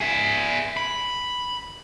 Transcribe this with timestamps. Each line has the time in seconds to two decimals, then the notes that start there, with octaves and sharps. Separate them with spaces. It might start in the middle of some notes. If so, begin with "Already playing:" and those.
0.01 G#4 E5
0.77 B5